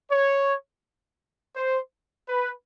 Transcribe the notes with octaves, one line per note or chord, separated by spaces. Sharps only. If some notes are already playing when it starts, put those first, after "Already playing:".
C#5
C5
B4